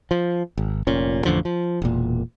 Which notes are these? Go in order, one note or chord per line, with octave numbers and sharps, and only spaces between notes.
F3
G#1
F1 A#2 C#4
A1 F2 D3 F3
F3
E1 A#2